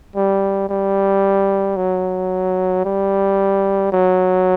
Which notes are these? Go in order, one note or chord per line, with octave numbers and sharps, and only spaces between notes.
G3
G3
F#3
G3
F#3